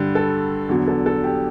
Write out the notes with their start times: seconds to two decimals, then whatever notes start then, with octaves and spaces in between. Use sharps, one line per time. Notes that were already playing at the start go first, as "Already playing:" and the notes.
Already playing: G2 D3 G3
0.15 A4
0.69 E2 D3 F#3
0.88 A4
1.06 A4
1.24 G4